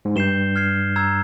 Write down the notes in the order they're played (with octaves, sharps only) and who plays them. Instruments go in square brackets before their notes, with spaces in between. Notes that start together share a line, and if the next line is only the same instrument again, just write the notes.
[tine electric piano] G#2
[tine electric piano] G2 [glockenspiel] G6 C7 E7 G7
[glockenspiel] F6 G#6 C7 E7
A#5 E6 G#6